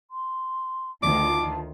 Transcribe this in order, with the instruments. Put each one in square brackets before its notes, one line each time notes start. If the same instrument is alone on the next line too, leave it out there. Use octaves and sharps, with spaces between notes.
[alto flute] C6
[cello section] D2 D#3 F4 [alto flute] A5 [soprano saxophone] D6